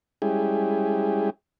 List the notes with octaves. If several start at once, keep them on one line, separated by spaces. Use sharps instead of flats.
G3 G#3 C#4 E4 G4 G#4